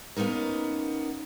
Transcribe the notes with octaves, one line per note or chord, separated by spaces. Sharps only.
A#3 B3 C#4 D#4 A#4